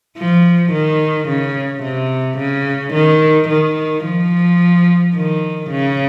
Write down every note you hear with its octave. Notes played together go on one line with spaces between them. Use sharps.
F3
D#3
C#3
C3
C#3
D#3
D#3
F3
D#3
C#3